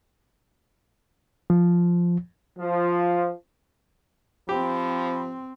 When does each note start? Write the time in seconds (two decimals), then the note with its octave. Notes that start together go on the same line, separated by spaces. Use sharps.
1.50 F3
2.59 F3
4.49 F3 C4 G4 B5